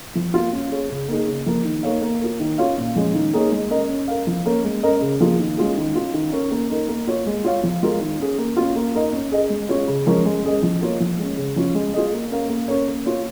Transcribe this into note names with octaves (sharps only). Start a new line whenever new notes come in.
F3
A#3 F4
C#4
G#4 C#5
C#3
A#3 D#4 G#4
C#3
F3 A#3
D#3
A#3 D#4 C#5 F5
A#3
F4 A#4
D#3
C#4 F4 C#5 F5
A#2
F3 G#3 C#4
D#3
A#3 D#4 G#4 C#5
G#3
C#4 A#4 D#5
C#4
A#4 F5
F3
A#3 C#4 A#4 C#5
G#3
C#4 A#4 D#5
C#3
F3 A#3 F4 G#4
D#3
G#3 C#4 F4 G#4
D#3
C#4 F4
D#3
C#4 A#4
A#3
D#4 A#4
A#3
F4 C#5
G#3
F4 C#5 F5
F3
G#3 F4 A#4
D#3
C#4 G#4
A#3
C#4 F4
A#3
D#4 A#4 D#5
C#4
G#4 D#5
G#3
C#4 F4 G#4 C#5
C#3
F3 G#3 C#4 A#4
G#3
C#4 G#4 D#5
F3
A#3 F4 C#5
F3
G#3 C#4
C#3
F3 C#4 F4
G#3
F4 G#4 D#5
A#3
C#4 A#4 F5
A#3
C#4 A#4 C#5
A#3
F4 C#5